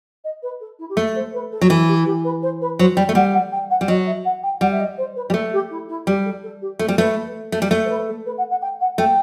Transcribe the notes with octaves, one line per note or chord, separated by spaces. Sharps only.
D#5
B4
A4
E4
G4
A3 A4
C5
B4
A4
F#3
E3 A4
G4
G4
B4
C5
B4
F#3 C5
G3 G5
A3
G3 F#5
F#5
G5
F#5
G3
F#3 D#5
E5
F#5
G5
G3 F#5
E5
D#5
C5
B4
G3 G4
A3 A4
G4
E4
E4
G3 G4
A4
A4
G4
A3 A4
G3
A3 B4
A3
G3
A3
C5
B4
A4
B4
F#5
F#5
G5
F#5
A3 G5